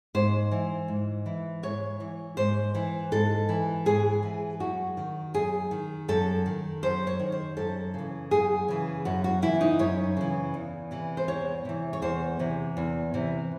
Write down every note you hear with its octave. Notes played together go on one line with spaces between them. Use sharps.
G#2 C5
E3
G#2
E3
G#2 C#5
E3
G#2 C5
E3
G#2 A4
E3
G#2 G#4
E3
F#2 F#4
D#3
F#2 G#4
D#3
F#2 A4
D#3
F#2 C5
C#5
D#3
C5
F#2 A4
C#3 E3
F#2 G#4
C#3 E3
F#2 F#4
F#4
C#3 E3 E4
D#4
F#2 C#5
C#3 E3
E2
C3 E3
C5
E2 C#5
C3 E3
C#5
E2 C5
C3 E3
E2
C3 E3